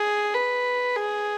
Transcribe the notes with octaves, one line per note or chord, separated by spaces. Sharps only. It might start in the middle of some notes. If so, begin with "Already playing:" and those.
Already playing: G#4
B4
G#4